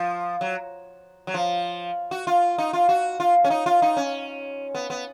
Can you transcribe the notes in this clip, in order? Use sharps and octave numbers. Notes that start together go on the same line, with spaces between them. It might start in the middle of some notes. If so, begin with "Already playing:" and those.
Already playing: F3
F#3
F#3
F3
F#4
F4
D#4
F4
F#4
F4
C#4
D#4
F4
D#4
C#4
B3
B3